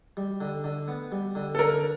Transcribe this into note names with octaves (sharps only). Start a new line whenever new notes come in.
G3
D3
D3
B3
G3
D3
A4
D3 A#4